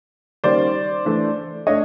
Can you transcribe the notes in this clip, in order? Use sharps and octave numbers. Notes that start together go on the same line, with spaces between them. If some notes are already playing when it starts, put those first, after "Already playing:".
D#3 G3 A#3 C#4 C5 D5
E3 A3 D4
A3 D4 C#5 D#5